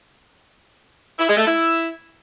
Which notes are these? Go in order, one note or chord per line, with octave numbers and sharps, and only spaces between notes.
E4
G#3
A3
E4